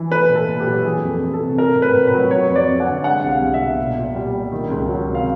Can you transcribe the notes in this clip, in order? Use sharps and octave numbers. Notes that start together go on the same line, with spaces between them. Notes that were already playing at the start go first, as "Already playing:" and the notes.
Already playing: E3
A3 B4
A#2
A4
A#2
G4
F#3
E3 G#4
F2
A4
A3
A4
C3
A3 A#4
A2
B4
A2
B4
F#3
F#3 C#5
F2
D5
F2
F#5
D3
G#3 F#5
C2
F5
C2
E5
B2
A#2
A#2
G3
G3
D#3
C#2
F#3
C3
F5